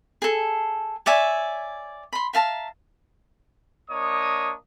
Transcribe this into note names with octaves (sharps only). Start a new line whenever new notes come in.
G#4 A4
C#5 D5 E5 G#5
B5 C6
E5 F5 A5 A#5
A#3 D4 C#5 D#5 D#6